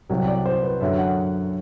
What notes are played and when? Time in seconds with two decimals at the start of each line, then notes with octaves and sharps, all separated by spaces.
0.10 C2 C3 F#3
0.27 D5
0.46 C5
0.63 B4
0.81 F#2 D3 F#3 E5
0.98 F#5